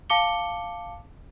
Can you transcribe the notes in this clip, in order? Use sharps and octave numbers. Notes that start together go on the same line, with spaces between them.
F5 A5 D6 C#7 G7